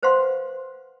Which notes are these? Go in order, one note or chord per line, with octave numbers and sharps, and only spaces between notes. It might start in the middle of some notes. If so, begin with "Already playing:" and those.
B4 C5 F5 F#5 C6